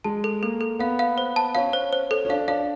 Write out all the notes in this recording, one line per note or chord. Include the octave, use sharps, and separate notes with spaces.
G#3 A5
A4
A#3 A4
A4
B3 F5
F5
C5
A5
C#4 F5
C5
C5
A4
C#4
D4 F5
D4 F5